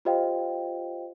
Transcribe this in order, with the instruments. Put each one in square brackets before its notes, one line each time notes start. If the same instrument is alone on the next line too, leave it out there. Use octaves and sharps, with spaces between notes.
[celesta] F4 G4 C5 D#5 F5 G5